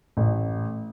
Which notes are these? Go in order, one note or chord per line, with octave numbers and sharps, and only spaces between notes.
A1